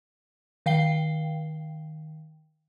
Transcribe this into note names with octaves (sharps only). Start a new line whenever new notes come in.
D#3 F5 G5 C7 G7